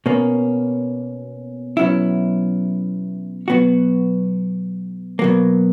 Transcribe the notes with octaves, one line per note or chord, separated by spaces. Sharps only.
B2 A#3 C#4
B2 F#3 C#4 E4
B2 F#3 B3 F#4
B2 F#3 A#3